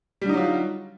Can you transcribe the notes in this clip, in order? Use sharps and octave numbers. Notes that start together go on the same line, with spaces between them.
D3 F#3 G3 D#4 F4